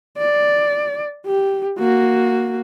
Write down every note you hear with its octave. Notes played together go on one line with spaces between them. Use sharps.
D5
G4
A#3 F#4